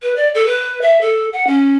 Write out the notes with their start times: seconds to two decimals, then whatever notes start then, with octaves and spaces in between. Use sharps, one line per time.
0.03 B4
0.16 D5
0.35 A4
0.46 B4
0.82 E5
1.01 A4
1.33 F#5
1.47 C#4